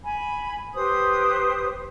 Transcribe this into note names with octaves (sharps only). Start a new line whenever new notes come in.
G#5 B5
G4 B4 C5 D#6